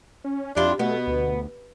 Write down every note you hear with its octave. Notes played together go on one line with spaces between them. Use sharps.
C#4
F2 G3 D4 E4 F4
B2 A3 B3
D2